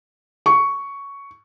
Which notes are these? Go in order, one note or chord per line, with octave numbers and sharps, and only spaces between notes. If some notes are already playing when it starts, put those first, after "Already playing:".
C#6